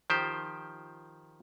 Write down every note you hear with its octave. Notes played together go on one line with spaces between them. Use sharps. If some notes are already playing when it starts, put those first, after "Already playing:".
D#3 F3 G4 C5